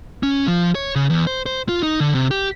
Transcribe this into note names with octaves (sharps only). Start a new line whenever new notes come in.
C#4
F3
C#5
C#3
E2
C5
C5
F4
D#4
D3
C3
G4